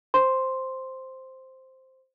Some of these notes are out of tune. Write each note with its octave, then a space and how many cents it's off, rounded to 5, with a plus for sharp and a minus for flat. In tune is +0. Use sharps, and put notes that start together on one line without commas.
C5 +0 C6 +0